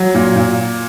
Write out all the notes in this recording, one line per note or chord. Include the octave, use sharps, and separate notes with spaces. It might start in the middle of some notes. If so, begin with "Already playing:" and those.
Already playing: F#3
A#2
A#2